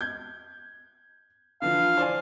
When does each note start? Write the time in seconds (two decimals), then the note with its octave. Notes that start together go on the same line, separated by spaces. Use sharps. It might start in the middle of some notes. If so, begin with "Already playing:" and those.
0.01 G6 G#6
1.62 D3 E3 F3 F5
1.97 C5 D5 G#5